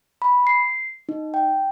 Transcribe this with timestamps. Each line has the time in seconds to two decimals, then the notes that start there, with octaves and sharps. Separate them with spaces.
0.22 B5
0.47 C7
1.09 D#4
1.34 G5